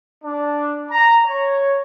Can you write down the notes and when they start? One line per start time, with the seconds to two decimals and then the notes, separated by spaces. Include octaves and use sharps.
0.23 D4
0.89 A#5
1.25 C#5